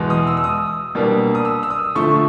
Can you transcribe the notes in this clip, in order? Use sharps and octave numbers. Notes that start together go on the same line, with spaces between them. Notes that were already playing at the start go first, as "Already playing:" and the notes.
Already playing: E2 B2 G#3
D#6
E6
E6
D#6
B2 G3 A#3 D4
D#6
E6
E6
D#6
D3 F3 A3 C#6